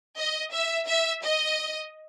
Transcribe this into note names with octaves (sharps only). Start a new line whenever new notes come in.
D#5
E5
E5
D#5